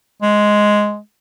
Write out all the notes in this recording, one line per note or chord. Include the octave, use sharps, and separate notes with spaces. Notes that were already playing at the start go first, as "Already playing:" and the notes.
G#3